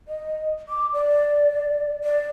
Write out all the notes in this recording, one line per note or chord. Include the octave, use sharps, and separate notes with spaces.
D#5
D6
D5
D5